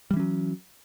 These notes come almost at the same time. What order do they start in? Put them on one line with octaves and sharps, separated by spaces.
G3 E3 C#4 F#3